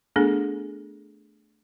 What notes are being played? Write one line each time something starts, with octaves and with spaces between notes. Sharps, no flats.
A3 B3 D4 G#4 A4